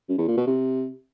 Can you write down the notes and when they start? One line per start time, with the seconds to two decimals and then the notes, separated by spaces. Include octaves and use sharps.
0.09 F#2
0.18 E2
0.28 A#2
0.37 B2
0.47 C3